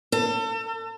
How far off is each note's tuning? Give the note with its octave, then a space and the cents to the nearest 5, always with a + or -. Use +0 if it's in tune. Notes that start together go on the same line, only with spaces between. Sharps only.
A4 +35